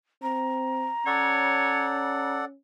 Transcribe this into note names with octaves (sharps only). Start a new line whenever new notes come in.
C4 A#5
C#4 A4 C#5 D5 F#5